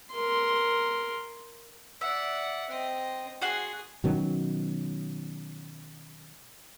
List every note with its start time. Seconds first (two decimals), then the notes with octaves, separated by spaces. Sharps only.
0.12 A#4 C6
2.01 D5 E5 F#5
2.69 C4 D#5
3.41 F#4 G#4 F#5 C6
4.04 B2 D#3 F#3 C#4